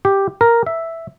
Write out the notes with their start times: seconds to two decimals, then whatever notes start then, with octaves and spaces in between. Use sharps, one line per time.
0.05 G4
0.41 A#4
0.66 E5